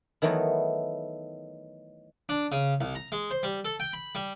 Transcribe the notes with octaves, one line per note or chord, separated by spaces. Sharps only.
D#3 E3 F#3 A3 B3
D4
C#3
C2
A#5
G#3
C5
G3
A4
G5
B5
G3